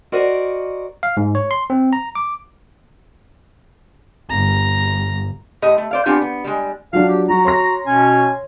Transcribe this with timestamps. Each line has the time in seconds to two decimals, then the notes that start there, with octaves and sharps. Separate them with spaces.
0.12 F#4 A#4 C5 D5 D#5
1.03 F5
1.17 G#2
1.35 C#5
1.51 C6
1.70 C4
1.93 A#5
2.15 D6
4.30 G1 A#5
5.62 A2 G4 D#5
5.78 A3
5.91 C5 D5 F5
6.06 B3 C4 D4 F4 G4 G#5
6.22 B3
6.44 G3 G#3
6.93 F3 F#3 D4 F5
7.09 G4
7.29 F#3 F#4 A#5
7.45 C#5 C6 A#6
7.87 B2 C#4 G#5